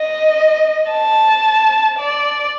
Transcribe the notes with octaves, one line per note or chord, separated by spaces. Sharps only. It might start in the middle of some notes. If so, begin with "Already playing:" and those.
Already playing: D#5
A5
D5